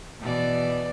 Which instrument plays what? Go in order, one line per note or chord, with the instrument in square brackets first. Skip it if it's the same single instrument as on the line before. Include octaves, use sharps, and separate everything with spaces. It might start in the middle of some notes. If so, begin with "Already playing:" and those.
[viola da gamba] B2 E3 D5